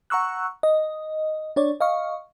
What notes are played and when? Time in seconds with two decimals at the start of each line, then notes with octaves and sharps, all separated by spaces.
0.10 F#5 A#5 C#6 E6 F#6
0.63 D#5
1.56 D4 C#5 D5
1.81 D#5 F5 C#6